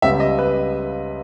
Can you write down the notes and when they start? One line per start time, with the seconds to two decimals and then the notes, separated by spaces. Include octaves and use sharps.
0.02 C#2 C#3 G3 B3 E5
0.20 D#5
0.39 B4